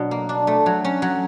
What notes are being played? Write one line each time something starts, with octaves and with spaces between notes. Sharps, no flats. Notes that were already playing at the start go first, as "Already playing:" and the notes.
Already playing: B2 F#3 D4
A#3
D4
A3
F#3
C#4
F#3